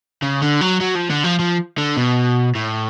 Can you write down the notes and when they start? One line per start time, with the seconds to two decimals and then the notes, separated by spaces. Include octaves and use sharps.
0.22 C#3
0.42 D3
0.61 F#3
0.81 F#3
0.96 F3
1.10 D3
1.24 F3
1.39 F3
1.78 D3
1.97 B2
2.55 A2